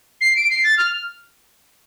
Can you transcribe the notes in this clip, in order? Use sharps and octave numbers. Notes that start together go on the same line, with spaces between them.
C7
D7
C7
A6
F6